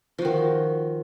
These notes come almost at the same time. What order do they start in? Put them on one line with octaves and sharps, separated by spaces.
F3 F#4 D#3